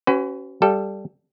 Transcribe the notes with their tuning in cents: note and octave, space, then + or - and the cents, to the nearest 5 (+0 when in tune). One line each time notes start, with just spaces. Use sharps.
C#4 -10 F#4 +35 B4 +30
G3 +0 A4 +0 F5 -40